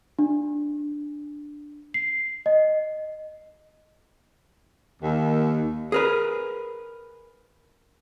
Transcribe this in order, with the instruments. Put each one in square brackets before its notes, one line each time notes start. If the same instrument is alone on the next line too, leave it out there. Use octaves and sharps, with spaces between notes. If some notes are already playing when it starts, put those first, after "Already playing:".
[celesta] D4
C7
D#5
[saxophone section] D#2
[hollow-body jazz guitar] G#4 A#4 B4